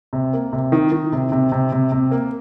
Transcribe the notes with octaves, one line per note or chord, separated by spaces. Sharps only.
C3
A#3
C3
D#3
D#3
C3
C3
C3
C3
C3
A#3